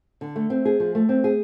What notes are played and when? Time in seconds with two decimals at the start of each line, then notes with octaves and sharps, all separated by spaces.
0.21 D3
0.36 A3
0.50 C4
0.65 G#4
0.80 F3
0.95 A3
1.09 C4
1.24 G#4